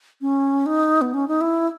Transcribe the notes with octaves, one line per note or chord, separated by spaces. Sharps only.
C#4
D#4
B3
C#4
D#4
E4